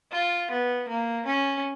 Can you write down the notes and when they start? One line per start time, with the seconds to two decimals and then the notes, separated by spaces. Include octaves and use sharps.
0.12 F4
0.51 B3
0.88 A#3
1.26 C#4